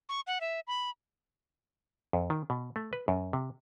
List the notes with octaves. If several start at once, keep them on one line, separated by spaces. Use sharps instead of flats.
C#6
F#5
E5
B5
F2
D#3
B2
A3
B4
F#2
C3